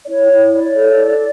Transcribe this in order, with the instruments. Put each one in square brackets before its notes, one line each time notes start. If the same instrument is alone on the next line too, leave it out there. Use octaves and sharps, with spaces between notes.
[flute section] D5
E4 C#5
E4
C#5 D5
A4
E4